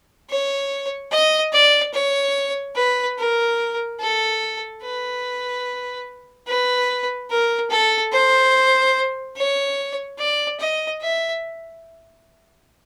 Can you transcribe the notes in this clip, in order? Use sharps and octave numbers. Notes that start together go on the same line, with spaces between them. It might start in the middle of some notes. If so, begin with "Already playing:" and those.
C#5
D#5
D5
C#5
B4
A#4
A4
B4
B4
A#4
A4
C5
C#5
D5
D#5
E5